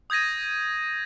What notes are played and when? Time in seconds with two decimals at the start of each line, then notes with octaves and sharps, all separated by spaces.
0.10 D#6 G6 G#6 A#6 D#7